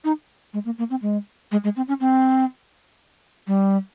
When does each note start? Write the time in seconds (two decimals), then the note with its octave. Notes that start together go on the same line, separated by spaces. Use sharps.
0.04 D#4
0.54 G#3
0.65 A#3
0.78 A#3
0.90 C4
1.02 G#3
1.52 G#3
1.64 G#3
1.77 C4
1.88 C#4
2.00 C4
3.47 G3